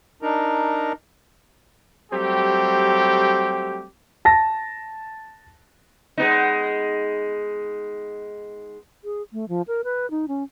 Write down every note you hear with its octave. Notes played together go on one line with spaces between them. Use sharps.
D4 D#4 A#4 A#5
F#3 G3 A3 C4 G4
A5 A#6
G#3 B3 D#4
G#4
A3
F3
A#4
B4
D#4
C#4